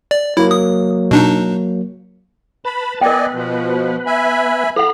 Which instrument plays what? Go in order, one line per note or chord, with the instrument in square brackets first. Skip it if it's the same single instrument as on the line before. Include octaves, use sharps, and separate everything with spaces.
[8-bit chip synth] D5
[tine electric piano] F#3 A#3 [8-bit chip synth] E4
[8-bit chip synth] D#6
B2 D4 D#4
[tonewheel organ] B4 A5 [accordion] B5
[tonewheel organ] B3 B4 [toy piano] A#4 G5 [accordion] D5 D#5 G#5
[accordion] B2 F3
E5 G#5 B5
[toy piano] A4 F#5 [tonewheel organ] F5 A#5 B5